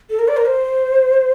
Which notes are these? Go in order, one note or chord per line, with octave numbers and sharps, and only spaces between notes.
A4
A#4
D5
A#4
C5